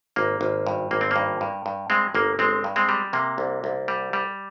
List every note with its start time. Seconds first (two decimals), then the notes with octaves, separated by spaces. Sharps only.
0.16 G#1 A#3
0.41 G#1
0.67 G2
0.91 G#1 A#3
1.01 C4
1.11 G2 A#3
1.41 G2
1.66 G2
1.90 G2 G#3 C4
2.15 G1 A#3
2.39 G1 G#3 C4
2.64 G2
2.76 G#3 C4
2.89 G3
3.13 C3 A#3
3.38 C2
3.64 C2
3.88 G3
4.13 G3